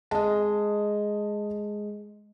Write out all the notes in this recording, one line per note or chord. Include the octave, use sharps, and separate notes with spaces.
G#3 D#5 A5